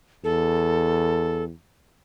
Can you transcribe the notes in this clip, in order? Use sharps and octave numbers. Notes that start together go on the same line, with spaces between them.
E2 A4